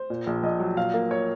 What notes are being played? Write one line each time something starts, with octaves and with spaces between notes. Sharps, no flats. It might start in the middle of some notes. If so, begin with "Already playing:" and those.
Already playing: C5
A#2
A#1
A#1 D#5
F#3
A#2 F5
A#3
C#5